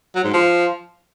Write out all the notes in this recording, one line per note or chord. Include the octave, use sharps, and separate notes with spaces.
F#3
G#2
F3